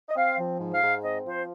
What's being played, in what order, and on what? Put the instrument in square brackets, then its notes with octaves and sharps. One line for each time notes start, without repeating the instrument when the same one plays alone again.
[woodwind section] D#5
C4 F5
F3
G#2
F5
G#2
C4 D#5
F3 C5